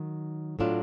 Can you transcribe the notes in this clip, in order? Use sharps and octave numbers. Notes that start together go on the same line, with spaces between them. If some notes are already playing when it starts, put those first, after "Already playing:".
Already playing: D#3 F#3
A2 F#3 A3 D4 F4